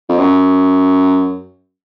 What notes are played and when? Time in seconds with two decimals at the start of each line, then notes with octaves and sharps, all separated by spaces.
0.09 F2
0.18 F#2